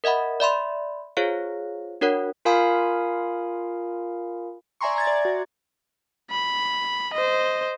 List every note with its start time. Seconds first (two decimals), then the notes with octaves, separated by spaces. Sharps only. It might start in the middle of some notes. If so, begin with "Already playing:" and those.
0.04 A#4 D#5 E5 F#5 B5
0.40 D5 E5 B5 C6
1.17 F4 G#4 C5 C#5 F5
2.01 D4 F#4 A#4 C#5 F#5
2.45 F4 A#4 F5 G#5 B5 D#6
4.81 D5 E5 G#5 A#5 C6 C#6
4.96 A#5 G#6 A6
5.07 D5
5.25 F#4
6.31 B5
7.14 C5 D#5